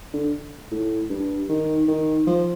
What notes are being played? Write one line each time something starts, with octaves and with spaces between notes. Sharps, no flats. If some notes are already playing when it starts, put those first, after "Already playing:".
D3
A2
G2
D#3
D#3
F3